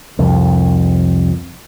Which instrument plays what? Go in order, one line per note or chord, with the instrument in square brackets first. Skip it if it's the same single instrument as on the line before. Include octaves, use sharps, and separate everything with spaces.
[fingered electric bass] C2 F2